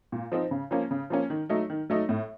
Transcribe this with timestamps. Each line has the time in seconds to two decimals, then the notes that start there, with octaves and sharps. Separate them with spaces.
0.12 A#2
0.32 F3 C4 D#4
0.51 C#3
0.71 F3 A#3 C#4
0.91 C#3
1.10 F3 A#3 C#4
1.30 D#3
1.49 F#3 A3 D#4
1.70 D#3
1.90 F#3 A3 D#4
2.09 A2